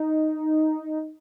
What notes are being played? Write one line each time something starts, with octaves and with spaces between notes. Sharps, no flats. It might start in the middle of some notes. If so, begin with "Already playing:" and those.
Already playing: D#4